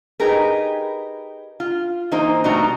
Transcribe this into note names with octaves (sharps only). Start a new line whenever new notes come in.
D#4 G4 G#4 A#4 B4
F4
E3 A#3 D#4 C5 D#5
B2 G3 A3 D#4 F#4 A#5